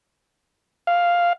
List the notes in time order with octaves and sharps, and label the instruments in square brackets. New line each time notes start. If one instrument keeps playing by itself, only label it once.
[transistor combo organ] F5